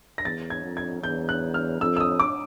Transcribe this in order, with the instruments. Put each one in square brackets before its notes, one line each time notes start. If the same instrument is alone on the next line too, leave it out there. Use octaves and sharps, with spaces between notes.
[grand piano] A#6
[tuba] E2 [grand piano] A6
[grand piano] G#6
[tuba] F2
[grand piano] G#6
[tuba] E2 [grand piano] G6
[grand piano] F#6
F6
[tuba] F2 [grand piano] E6
[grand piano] E6
D#6
D6